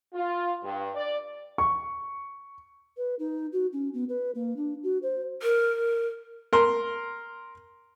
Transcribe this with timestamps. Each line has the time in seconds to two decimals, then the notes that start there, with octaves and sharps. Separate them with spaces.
0.14 F4
0.64 G2
0.96 D5
1.58 C#6
2.97 B4
3.19 D#4
3.52 F#4
3.72 C#4
3.93 B3
4.09 B4
4.34 A#3
4.56 D4
4.83 F#4
5.02 C5
5.43 A#4
6.53 A#4 C6